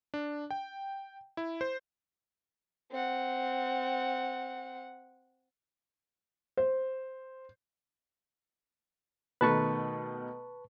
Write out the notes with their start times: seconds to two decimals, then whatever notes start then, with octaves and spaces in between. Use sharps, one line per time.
0.14 D4
0.51 G5
1.37 E4
1.61 C5
2.91 C4 F#5
6.57 C5
9.41 B2 D#3 A3 B4 A5 C#6